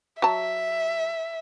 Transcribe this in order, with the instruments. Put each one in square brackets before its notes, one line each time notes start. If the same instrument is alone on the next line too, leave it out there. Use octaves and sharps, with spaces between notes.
[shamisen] F#3 A5 [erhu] E5